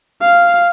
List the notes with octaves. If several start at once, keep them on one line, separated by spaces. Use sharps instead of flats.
F5